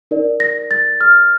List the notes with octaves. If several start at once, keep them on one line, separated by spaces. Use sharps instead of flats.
D#4 A#4 D5
A#6
A6
F6